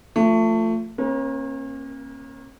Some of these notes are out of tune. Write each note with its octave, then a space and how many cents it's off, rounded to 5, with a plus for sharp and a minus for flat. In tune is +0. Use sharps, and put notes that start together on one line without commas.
F3 +0 A3 +25
A#3 +0 C#4 -40 A#4 +40